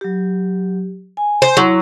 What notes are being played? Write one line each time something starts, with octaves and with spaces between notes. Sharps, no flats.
F#3 G4
G#5
C5
F#3 E4 C6